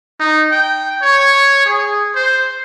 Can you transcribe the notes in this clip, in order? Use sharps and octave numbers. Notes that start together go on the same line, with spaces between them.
D#4
G5
C#5
G#4
C5